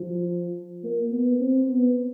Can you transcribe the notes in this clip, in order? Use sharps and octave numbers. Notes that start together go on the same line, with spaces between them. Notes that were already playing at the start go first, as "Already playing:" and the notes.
Already playing: F3
A#3
B3
C4
B3